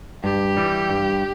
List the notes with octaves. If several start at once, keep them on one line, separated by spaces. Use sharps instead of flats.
G2 G4
E3 G3
G2